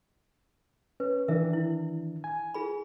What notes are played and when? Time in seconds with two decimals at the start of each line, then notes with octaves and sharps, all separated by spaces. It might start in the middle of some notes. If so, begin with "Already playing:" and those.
1.00 C#4 B4
1.28 D#3 E3 D4 A#4 E5
1.53 E4
2.24 G#5
2.54 F4 G#4 B5